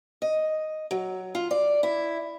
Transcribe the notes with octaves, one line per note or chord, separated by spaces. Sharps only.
D#5
F#3
F4
D5
E4